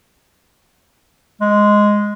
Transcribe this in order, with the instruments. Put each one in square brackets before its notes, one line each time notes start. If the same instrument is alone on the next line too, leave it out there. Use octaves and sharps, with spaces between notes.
[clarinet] G#3